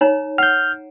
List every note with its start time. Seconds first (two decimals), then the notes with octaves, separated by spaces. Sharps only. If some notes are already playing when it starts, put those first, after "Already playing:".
0.01 D#4 C#5 A#5
0.38 F#5 F6 G6